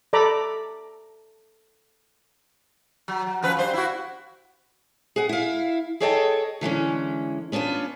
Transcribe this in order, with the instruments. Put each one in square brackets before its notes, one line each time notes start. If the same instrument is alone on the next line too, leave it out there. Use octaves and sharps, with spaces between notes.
[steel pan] A4 D5 A#5 B5 D6
[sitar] F#3
F#3
F#2 F3 B4
G2 C5
E4 F#4
[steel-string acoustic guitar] G#4 F#5
E4 F5
G#4 A4 C#5 D#5 G5 A5
D3 E3 G#3 C#4
B3 C#4 D4 F4 B4